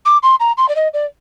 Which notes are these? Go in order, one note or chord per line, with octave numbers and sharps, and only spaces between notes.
D6
C6
A#5
C6
D5
D#5
D5